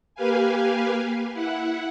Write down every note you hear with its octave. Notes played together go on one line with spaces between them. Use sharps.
A#3 G4 B4 F5 G#5
E4 F#5